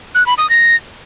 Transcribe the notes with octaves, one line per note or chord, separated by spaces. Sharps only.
F#6
B5
D#6
A#6